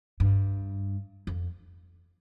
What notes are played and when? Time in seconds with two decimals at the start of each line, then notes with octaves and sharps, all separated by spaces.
0.20 G2
1.27 F2